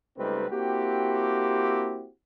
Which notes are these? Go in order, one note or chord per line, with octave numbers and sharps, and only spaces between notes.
C#2 G3 A3 C4 D#4 B4
A#3 C4 E4 F#4 G4